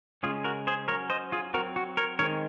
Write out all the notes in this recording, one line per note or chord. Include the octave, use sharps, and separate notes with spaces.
C#3 G#3 C#4 F4 G#4
F#4 A#4
G#4 C5
F#3 C#4 A#4 C#5
C5 D#5
F4 G#4
F#3 C4 F#4 A#4
F#4
A#4 C#5
D#3 G#3 C4 A#4 C#5